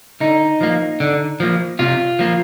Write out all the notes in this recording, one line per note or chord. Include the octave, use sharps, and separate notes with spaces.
D3 D#4
F3 A#3
D3
F3 A#3
C3 F4
F3 A#3